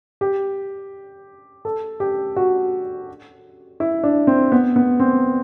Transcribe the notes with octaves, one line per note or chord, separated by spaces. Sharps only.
G4
A4
G4
F#4
E4
D4
C4
B3
B3
C4